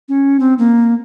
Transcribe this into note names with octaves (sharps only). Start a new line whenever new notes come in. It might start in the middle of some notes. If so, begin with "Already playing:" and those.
C#4
C4
A#3